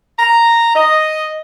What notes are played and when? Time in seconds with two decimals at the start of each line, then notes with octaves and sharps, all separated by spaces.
0.19 A#5
0.75 D#5